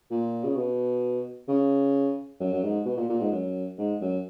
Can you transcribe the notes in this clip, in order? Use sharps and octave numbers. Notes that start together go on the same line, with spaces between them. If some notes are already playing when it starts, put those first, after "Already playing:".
A#2
C#3
B2
C#3
F#2
F#2
G#2
B2
A#2
A#2
G#2
F#2
G#2
F#2